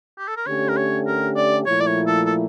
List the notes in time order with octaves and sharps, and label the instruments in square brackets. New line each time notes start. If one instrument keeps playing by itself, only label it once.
[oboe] G4
A4
A#4
[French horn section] D3 A3 C#4 G4 [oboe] C#5
[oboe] A#4
C#5
A#4
D5
[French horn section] A#2 F3 A3 E4 [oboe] C#5
[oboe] D5
C#5
A4
A4